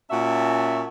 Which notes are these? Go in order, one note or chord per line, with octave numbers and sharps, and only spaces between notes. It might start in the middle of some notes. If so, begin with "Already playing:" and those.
A#2 C#4 F#4 E5 G#5 A5